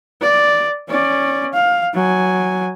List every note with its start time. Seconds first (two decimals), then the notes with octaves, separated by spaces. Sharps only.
0.21 D5
0.89 C#4 D5
1.54 F5
1.94 F#3 G#5